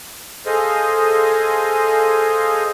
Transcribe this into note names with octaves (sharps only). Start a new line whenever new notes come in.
G#4 A4 C5 D#5 F5 G#5